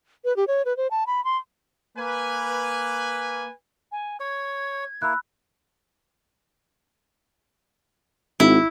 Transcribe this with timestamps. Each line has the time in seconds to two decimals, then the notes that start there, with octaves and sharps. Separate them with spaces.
0.25 B4
0.36 G4
0.47 C#5
0.65 B4
0.77 C5
0.91 A5
1.07 B5
1.24 C6
1.97 A#3 B4 G#5
3.92 G#5
4.20 C#5 G#6
5.02 A#3 E4 B5 E6 F#6
8.40 G#1 E4